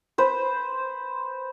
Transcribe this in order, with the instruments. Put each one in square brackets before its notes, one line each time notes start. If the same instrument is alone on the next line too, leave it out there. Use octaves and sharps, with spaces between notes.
[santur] B4 C5